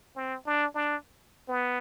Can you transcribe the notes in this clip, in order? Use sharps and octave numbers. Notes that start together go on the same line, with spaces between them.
C4
D4
D4
B3